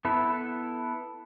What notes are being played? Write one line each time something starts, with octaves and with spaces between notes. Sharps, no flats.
B3 E4 A4